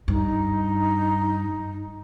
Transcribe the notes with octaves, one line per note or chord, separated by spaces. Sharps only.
G2 D#4